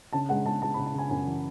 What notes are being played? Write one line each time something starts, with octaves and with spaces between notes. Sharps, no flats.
C#3 A5
G#3 F#5
G#3 A5
G#3 A5
B5
C#3
A5
C#3 G#5
F#2 G#5
E3